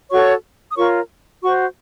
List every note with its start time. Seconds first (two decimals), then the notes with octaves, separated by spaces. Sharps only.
0.10 F#4 A4 C#5 C#6
0.70 D#6
0.76 F4 A#4 C#5 C#6
1.42 F#4 C5 C#6